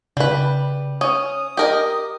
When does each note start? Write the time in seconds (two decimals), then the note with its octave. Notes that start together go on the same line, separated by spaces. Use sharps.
0.17 C#3 G3 B4
1.01 C#4 D#6
1.57 G4 A#4 D#5